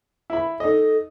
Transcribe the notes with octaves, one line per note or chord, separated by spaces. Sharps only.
E4 B5
D#4 A4 D#5